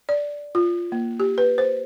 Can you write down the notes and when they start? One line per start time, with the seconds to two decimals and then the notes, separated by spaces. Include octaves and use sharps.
0.09 D5
0.55 F4
0.92 A#3
1.20 G4
1.38 B4
1.58 C5